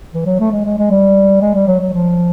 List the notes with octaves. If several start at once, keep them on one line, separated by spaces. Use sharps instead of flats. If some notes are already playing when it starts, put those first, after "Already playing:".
E3
F#3
A3
G#3
G#3
G#3
G3
G#3
G3
F#3
F#3
F3